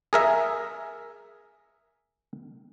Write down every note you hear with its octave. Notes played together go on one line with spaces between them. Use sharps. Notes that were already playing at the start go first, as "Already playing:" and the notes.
G#4 A#4 E5